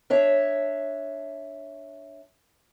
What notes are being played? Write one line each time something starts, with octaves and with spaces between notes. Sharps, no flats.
D4 C#5 E5